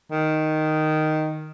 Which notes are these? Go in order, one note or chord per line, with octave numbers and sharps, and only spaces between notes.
D#3